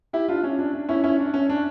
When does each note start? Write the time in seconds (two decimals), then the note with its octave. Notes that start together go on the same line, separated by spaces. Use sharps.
0.13 E4 G4
0.28 D4 F4
0.44 C#4
0.59 D4
0.73 D4
0.89 C#4 E4
1.04 C#4 E4
1.19 D4
1.34 C#4
1.50 D4